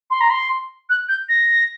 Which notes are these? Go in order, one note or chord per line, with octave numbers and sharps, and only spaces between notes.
C6
A#5
C6
F#6
G6
A#6